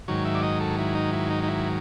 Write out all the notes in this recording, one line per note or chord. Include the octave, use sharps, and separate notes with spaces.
G#2 D#3 F#3 C#5
E5
D5
D#5
A4
E4
D#4
E4
D#4
D#4
E4